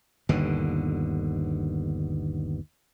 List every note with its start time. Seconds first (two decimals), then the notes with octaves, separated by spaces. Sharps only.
0.29 G1 D#2 B2 D3